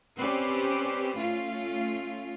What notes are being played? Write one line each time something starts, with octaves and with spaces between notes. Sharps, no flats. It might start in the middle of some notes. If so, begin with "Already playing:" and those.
C4 C#4 G4 B4 C5 D5
A3 C#4 F4